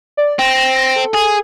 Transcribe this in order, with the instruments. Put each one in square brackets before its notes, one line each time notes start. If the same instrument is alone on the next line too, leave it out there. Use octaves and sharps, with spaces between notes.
[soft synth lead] D5
[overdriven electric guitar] C4 [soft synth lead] A#6
[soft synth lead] A4
[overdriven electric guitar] G#4